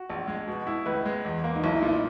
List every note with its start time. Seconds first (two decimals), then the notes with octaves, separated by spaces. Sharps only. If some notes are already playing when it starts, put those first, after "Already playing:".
Already playing: F#4
0.10 A#1
0.28 G#3
0.47 B2
0.67 E4
0.86 C#2 B4
1.06 G#3
1.25 E2
1.44 A#3
1.55 D#4
1.64 B1 E4
1.76 E4
1.82 A#2
1.89 E4